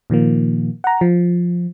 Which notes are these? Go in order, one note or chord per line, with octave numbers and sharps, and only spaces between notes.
A#2 D#3 F3 A#3
F#5 A#5
F3